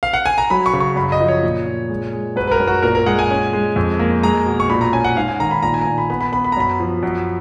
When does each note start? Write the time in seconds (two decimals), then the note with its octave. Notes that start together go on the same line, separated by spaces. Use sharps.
0.03 F5
0.13 F#5
0.26 G#5
0.38 A#5
0.50 F#3 B5
0.66 C#6
0.73 C#3
0.80 C#6
0.96 F#2 B5
1.12 D#5
1.21 F3
1.28 C#5
1.43 A#2
1.66 A#2
1.89 G#3
2.13 G#3
2.36 F#2 B4
2.48 B4
2.51 A#4
2.60 F#2
2.68 F#4
2.83 A#2 A#4
2.95 A#4
3.06 G#3 F#5
3.19 G#5
3.30 C#4
3.53 G#3
3.76 F2
3.99 A#3
4.23 G#3 A#5
4.46 B2
4.60 C#6
4.69 A#2 B5
4.81 A#5
4.93 C#4 G#5
5.04 F#5
5.16 G#2 F5
5.28 G#5
5.40 D#3 A#5
5.51 B5
5.63 A#2 A#5
5.74 G#5
5.81 A#5
5.86 A#2 G#5
5.98 B5
6.10 B3 B5
6.21 B5
6.32 B3 B5
6.44 B5
6.52 A#5
6.57 F#2 B5
6.80 F3
7.03 F#2